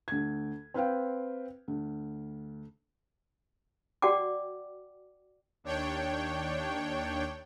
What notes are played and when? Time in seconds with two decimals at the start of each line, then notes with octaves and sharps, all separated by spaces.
0.08 D2 G#6
0.74 C4 B4 F5 G5
1.68 D2
4.02 F#4 D5 F#5 G5 D6
5.64 D#2 D4 C#5 G5